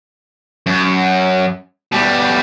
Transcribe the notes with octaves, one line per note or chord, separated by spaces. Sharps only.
F#2
B2 G3